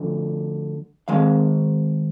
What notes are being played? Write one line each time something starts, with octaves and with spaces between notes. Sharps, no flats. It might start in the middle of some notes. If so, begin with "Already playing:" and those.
Already playing: D2 D3 F3
D#3 G#3 F5